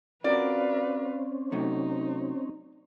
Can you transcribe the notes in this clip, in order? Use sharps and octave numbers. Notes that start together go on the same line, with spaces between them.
C4 C#4 F4 F#4 A#4 B4 D5 F5
C3 F#3 A3 D#4